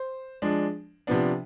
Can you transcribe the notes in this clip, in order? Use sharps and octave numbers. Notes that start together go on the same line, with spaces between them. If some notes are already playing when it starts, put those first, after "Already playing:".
Already playing: C5
F3 G#3 D4
C3 F3 B3 D4